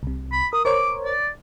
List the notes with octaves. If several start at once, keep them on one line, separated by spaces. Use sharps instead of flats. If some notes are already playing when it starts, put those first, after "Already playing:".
C2 C3
B5
A#4 D#6
A#4 C5 C#5 D6
D5